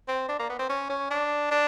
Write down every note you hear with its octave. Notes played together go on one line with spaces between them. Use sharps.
C4
D4
A#3
B3
C4
C#4
C#4
D4
D4